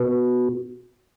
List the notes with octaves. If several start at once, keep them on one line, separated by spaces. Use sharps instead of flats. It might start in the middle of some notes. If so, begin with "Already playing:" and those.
Already playing: B2